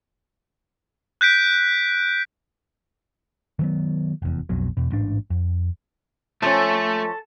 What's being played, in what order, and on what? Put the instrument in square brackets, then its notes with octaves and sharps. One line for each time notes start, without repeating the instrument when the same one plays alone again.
[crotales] F#6 G6 B6 D7
[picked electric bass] D#3 F#3 B3
F1 E2
B1 F2 B2 F#3
E2 B2
A1 G#2 D4
F2
[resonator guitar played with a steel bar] F3 C#4 [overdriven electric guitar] A3 [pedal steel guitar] A4